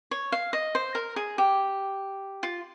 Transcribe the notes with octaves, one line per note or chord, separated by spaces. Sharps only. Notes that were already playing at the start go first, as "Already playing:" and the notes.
C#5
F5
D#5
C5
A#4
G#4
G4
F4